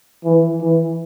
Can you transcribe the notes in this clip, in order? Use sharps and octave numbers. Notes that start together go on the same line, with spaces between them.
E3
E3